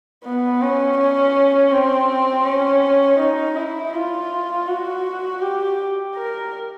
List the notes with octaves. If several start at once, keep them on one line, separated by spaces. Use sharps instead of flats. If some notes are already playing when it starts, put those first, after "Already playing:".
B3
C#4
C#4
C4
C#4
D#4
E4
F4
F#4
G4
A#4